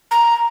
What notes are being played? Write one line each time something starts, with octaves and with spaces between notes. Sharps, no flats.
A#5